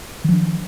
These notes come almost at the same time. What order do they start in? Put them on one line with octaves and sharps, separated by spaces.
D#3 F3 D4